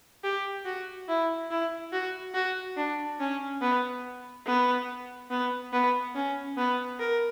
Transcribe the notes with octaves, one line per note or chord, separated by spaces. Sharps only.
G4
F#4
E4
E4
F#4
F#4
D4
C#4
B3
B3
B3
B3
C#4
B3
A#4